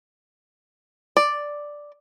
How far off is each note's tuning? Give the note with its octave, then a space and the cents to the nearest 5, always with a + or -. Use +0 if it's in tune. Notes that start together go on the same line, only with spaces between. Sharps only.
D5 +0